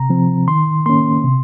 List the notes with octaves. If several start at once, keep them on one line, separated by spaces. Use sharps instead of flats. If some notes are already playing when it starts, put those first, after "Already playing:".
Already playing: C3 A#5
F3 C4
D#3 C6
A#3 C#4 C6
C3